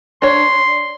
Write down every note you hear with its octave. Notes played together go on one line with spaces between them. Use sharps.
D4 C#5 C6